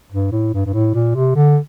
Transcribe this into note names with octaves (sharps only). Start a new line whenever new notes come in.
G2
A2
G2
G2
A2
A#2
C3
D3